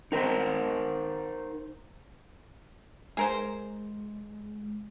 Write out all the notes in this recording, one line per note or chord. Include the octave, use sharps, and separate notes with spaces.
D#4 A#4 C5
G#3 G#4 A#4 C5